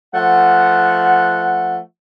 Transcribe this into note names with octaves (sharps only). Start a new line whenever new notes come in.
F3 A3 F#5